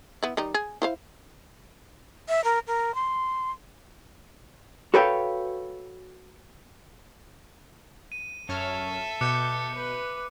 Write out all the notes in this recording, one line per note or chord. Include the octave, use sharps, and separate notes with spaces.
B3 E4
D#3 G3 D#4
G#4
E4 C5 F5
E5
A#4
A#4
C6
F#4 A4 B4 C#5 F5 G5
D#7
F#2 A4 C#5 E5 F6
B2 D6 F#6 G6 C#7
B4